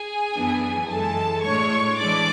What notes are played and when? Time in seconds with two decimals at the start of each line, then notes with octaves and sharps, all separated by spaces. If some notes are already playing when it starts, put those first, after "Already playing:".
Already playing: G#4 G#5
0.34 F#2 E3 B3 D4
0.89 F#2 E3 G#3 A4 A5
1.43 A2 G#3 D4 C#5 C#6
1.99 E3 G#3 D4 D5 D6